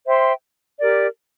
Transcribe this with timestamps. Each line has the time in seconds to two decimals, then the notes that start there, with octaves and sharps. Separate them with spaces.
0.06 C5 E5 G5 C6
0.81 G4 A#4 D5